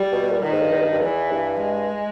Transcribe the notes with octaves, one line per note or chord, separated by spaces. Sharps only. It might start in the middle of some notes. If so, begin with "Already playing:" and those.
Already playing: G3
B2
B2
A#2
A#2 D#3
G#2
G2
E2
G2
G2
E2 E3
G2
G#3